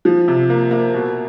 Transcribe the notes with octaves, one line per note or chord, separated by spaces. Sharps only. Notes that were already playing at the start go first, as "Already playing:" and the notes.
F3
C3
A#3
A#3
B2